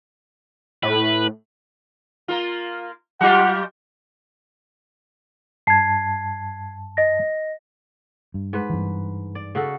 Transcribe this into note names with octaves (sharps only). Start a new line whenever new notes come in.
A2 B4
A#3 F4
F#3 F4 G4 F#5
G2 A5 G#6 C7
D#5 A#6
G2
G#2 B4
G2 E3
D5
C#3 F#4 A4